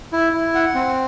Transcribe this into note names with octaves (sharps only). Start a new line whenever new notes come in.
E4
E4
F#5
C4